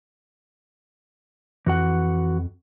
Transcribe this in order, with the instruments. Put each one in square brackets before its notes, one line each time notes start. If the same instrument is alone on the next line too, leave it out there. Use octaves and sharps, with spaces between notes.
[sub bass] F2 [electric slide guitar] E3 F#4 F#5